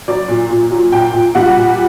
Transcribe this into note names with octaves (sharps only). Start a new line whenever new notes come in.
F#3 D5
A#2
A#2
F#3
A#2 G5
A#2
G3 F#5
A#2